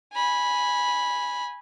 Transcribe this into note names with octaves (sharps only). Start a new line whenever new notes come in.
G#5 B5